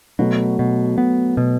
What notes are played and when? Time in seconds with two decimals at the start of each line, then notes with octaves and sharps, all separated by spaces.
0.19 B2 F#3 A3
0.59 B2
0.98 B3
1.37 B2